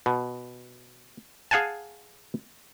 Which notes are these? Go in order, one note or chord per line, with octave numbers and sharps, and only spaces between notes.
B2
G#4 F5 F#5 G#5 A5